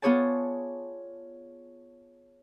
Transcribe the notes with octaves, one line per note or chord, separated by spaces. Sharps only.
B3 F4 G#4 C#5 D5 A5